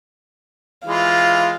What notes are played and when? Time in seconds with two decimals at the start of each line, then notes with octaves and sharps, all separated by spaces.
0.86 E3 G#3 F4 F5